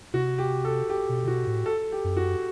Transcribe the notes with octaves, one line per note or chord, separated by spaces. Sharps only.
C3 F#4
G4
A4
G4
B2
C3
B2 F#4
A2
A4
G4
F#2
F#4